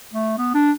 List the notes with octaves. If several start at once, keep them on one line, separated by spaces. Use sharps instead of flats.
A3
B3
D4